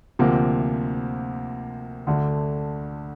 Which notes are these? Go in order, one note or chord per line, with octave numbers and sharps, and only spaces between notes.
D2 C3 F3 A#3
D2 D3 A3